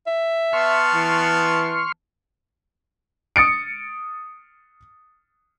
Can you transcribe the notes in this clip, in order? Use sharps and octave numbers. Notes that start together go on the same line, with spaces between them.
E5
B3 A5 C6 C#6 F6
E3
D#6 A6 C#7 D7